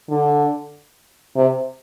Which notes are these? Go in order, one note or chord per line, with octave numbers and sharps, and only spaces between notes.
D3
C3